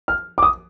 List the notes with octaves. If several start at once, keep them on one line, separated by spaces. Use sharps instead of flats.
F6
D6
D#6